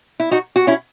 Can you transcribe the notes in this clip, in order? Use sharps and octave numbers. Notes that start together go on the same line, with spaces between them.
E4
D#4 F#4
F#4
C#4 E4